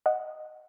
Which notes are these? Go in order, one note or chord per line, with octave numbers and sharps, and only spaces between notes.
D#5 F#5